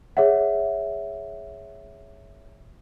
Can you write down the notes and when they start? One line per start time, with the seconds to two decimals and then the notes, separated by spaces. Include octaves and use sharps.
0.17 G#4 C#5 E5 F#5